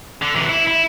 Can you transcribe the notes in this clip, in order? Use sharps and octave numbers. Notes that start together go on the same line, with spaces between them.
D3
C3 E3
E4
E4